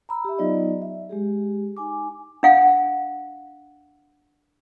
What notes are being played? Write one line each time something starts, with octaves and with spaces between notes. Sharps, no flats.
A#5 B5 E6
G4 E5
F#3 B3 D#4 F4 D5 D#5
E5
G#3 G4 G#4
D#4 G#5 D6
D4 F5 F#5